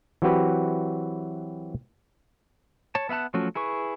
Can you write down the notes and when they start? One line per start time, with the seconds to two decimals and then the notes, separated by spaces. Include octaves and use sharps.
0.22 E3 F#3 C4 F#4 G4 B4
2.95 C#5 A5
3.09 B3 E5 F#5 A5 F#6
3.34 F3 F#3 A3 C#4 F#4
3.55 E4 G#4 B4 C#6